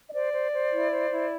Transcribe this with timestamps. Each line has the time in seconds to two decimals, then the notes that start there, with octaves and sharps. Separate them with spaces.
0.08 D#5
0.14 C5 D5
0.33 C5
0.53 C5
0.71 E4
0.90 C5
1.09 E4